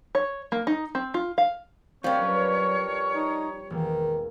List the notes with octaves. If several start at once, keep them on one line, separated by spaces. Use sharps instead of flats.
C#5
A#3
D#4
C4
F4
F5
F3 G3 C4 D4 A#4 C#5
F#3 C#4 B4
D#4
E1 D#3 A#3